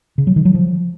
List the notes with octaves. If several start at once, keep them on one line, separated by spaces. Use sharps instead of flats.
C#3
F#3
D#3
F#3
F3